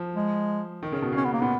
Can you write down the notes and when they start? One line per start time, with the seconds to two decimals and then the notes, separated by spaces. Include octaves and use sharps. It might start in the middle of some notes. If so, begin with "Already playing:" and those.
Already playing: F3
0.16 G#3
0.83 D#3
0.92 C#3
1.02 B2
1.12 C#3 C#4
1.24 B3
1.33 A#3
1.41 A#2 B3